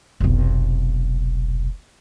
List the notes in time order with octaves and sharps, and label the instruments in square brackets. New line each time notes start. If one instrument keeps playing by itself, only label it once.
[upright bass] F1 B1